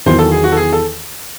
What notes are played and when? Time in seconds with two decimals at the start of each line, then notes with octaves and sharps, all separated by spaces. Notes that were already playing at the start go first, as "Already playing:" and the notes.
0.06 E2 D#3 F#3 C5
0.19 A4
0.31 G#4
0.44 F#4
0.52 A4
0.57 G#4
0.73 A4